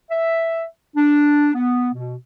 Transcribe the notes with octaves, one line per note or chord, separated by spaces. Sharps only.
E5
D4
B3
B2